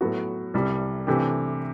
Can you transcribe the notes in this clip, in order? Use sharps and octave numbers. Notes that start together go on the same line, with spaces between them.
A2 F#3 B3 F#4
C2 C3 G3
C3 E3 A3 D4 G4